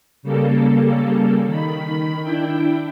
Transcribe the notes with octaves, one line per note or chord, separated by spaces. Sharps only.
C#3 G3 A#3 A4
D#3 B5
D4 E4 G5